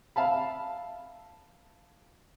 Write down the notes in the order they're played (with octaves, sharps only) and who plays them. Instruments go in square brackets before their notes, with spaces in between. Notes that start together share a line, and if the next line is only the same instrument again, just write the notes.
[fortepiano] E5 F5 A5 B5